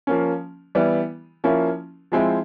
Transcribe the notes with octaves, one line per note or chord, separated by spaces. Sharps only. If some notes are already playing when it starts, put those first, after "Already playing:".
F3 A#3 C#4
E3 G3 B3 E4
F3 A#3 C#4 E4
F3 G#3 C4 E4